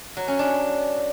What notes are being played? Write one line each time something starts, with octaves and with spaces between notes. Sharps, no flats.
F#3
C#4
D4